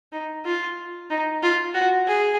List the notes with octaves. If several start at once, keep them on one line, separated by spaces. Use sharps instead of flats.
D#4
F4
D#4
F4
F#4
G#4